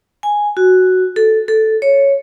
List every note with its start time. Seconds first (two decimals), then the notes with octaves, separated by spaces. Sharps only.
0.23 G#5
0.57 F#4
1.16 A4
1.48 A4
1.82 C#5